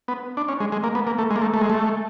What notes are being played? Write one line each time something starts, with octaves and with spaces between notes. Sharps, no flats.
B3
D4
C#4
G#3
G#3
A#3
B3
A#3
A3
G#3
A#3
A3
A3
G#3
A3